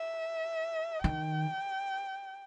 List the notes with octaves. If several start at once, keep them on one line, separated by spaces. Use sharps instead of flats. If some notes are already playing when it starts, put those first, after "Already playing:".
Already playing: E5
D#3 G5